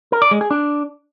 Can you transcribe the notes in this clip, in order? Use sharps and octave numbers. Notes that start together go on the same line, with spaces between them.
A#4
D5
G#3
G#4
D4